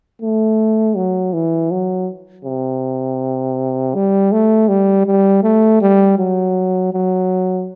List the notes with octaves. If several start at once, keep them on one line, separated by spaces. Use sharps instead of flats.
A3
F#3
E3
F#3
C3
G3
A3
G3
G3
A3
G3
F#3
F#3